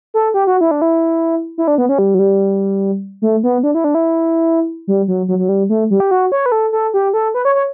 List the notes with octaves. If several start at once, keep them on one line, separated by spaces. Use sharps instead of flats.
A4
G4
F#4
E4
D4
E4
E4
D4
B3
C#4
G3
F#3
G3
A3
B3
D4
E4
D4
E4
G3
F#3
F#3
F#3
G3
A3
G3
G4
F#4
C#5
B4
A4
A4
G4
A4
B4
C#5
C#5